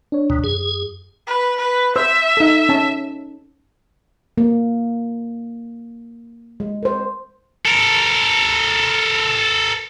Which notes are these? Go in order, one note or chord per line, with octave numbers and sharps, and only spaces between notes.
D4 C#5
D#2 B2
F#2 G#4
B4
B4
C5 E5 E6
D#4 A4
C#4 A5
A#3
G#3
A#4 C5
A4 A#4